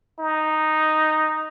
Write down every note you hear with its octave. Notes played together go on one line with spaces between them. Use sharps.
D#4